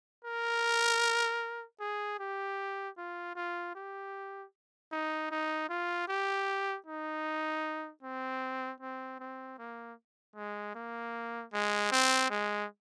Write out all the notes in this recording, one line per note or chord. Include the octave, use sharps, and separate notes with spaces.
A#4
G#4
G4
F4
F4
G4
D#4
D#4
F4
G4
D#4
C4
C4
C4
A#3
G#3
A#3
G#3
C4
G#3